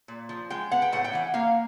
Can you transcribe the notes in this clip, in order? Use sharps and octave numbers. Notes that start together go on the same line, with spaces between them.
A#2
F3
G#3 G5
B3 F#5
G5
A2 F#5
G5
E3 F#5
A#3 F5